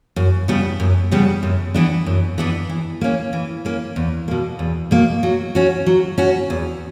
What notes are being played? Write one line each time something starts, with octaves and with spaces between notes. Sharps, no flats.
F#2
C#3 G3 B3 D4
F#2
C#3 G3 B3 D4
F#2
E3 B3 D4
F#2
E3 B3 D4
E3
A#3 C#4
E3
A#3 C#4
E2
B2 A#3
E2
B2 A#3
F#3
C#4 F#4
F#3
C#4 F#4
E2